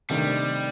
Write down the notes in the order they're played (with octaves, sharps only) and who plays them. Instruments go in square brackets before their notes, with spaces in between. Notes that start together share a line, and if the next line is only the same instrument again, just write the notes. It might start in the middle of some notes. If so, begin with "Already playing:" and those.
[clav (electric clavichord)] C3 D#3 A3 D4 G4 [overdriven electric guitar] G3